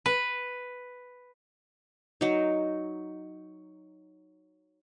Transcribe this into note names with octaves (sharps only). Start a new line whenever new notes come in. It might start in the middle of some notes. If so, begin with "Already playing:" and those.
B4
F#3 D#4